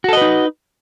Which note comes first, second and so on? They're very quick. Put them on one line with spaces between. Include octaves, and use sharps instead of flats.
F#4 A4 D#5 B4 D#4